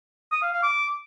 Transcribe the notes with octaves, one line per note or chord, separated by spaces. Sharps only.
D#6
F5
F5
D6